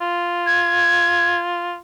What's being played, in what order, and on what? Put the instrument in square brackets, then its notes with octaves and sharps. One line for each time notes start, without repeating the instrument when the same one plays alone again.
[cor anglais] F4
[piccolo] G#6